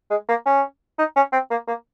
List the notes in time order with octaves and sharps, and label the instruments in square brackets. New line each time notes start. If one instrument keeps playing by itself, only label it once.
[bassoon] G#3
A#3
C#4
D#4
C#4
C4
A#3
A#3